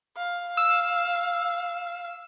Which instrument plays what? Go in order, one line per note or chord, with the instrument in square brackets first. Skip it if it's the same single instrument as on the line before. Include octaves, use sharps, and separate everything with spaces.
[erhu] F5
[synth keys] E6